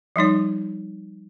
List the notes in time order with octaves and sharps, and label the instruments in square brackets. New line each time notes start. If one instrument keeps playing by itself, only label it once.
[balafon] F3 G3 D#4 C#5